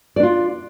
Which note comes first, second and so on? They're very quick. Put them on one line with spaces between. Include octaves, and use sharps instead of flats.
D5 D4 F4